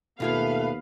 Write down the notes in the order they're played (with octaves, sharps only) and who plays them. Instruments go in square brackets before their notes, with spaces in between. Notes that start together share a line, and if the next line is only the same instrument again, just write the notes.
[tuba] D#2 [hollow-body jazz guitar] B2 F4 G#5 [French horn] A3 [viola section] B3 B4 F5